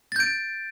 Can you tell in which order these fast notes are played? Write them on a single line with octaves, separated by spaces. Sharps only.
A6 G6 D7